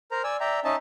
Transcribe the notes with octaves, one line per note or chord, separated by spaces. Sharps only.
A#4 C5 A#5
D5 G#5 E6
D5 E5 G5 A#5
C#4 D#4 D#5 E5 A5